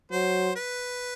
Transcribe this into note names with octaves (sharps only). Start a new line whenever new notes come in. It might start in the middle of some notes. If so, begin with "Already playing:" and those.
F#3 C5
B4